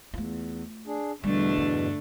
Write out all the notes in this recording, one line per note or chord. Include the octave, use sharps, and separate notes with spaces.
E2 A3 F4
D4 G#4
E2 B2 D3 G3 A3 D4
G2